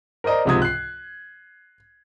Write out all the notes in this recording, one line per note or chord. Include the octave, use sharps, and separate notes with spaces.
A#4 C5 D5 D#5 A#5
C#2 G#2 C3 F3 D#6 G#6
F#6 C7